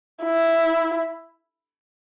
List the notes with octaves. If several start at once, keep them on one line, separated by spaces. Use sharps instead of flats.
E4